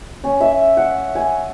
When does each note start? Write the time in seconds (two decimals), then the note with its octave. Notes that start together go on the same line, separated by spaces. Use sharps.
0.24 C#4
0.41 E5
0.77 F#5
1.15 G#5